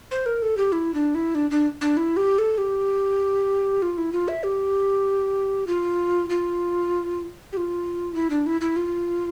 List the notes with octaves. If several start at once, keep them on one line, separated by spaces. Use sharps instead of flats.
C5
A#4
A4
G4
E4
D4
E4
D4
D4
D4
E4
G4
A4
G4
F4
E4
F4
E5
G4
F4
F4
G4
F4
E4
D4
E4
E4
F4